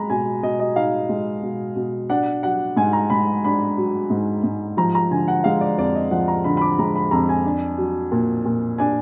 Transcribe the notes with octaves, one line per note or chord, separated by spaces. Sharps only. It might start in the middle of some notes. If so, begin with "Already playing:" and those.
Already playing: G#3 A#5 B5
B2 G#5
B2 D#5
D#5
D#4 F5
G#3
B2
B2
D4 F#5
F#3 F#5
G#2 G#5
A#5
G#2 B5
D4 B5
F#3
G#2
G#2
F3 A#5
A#5
D3 G#5
F#5
G#3 F5
D5
F2 D5
D#5
F3 F#5
A#5
D3 B5
B5
D6
G#3 A#5
B5
F2 A#5
G#5
D4
F#3
A#2
A#2
D4 G#5